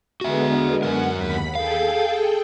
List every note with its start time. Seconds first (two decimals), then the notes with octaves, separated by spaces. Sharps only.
0.21 D3 G#3 B3 F#4 E5
0.83 F#2 D#3 A#4 F#5
1.16 D#2 B5 B6
1.55 G#4 A4 F5 G5